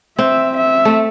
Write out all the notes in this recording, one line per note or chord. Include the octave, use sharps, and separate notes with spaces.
C4 E5
E5
A3